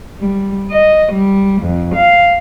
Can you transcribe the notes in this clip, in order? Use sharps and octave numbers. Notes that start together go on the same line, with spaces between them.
G3
D#5
G3
F2
F5